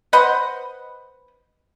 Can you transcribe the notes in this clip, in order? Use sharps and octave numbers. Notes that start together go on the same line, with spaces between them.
B4 C5 D#5 F#5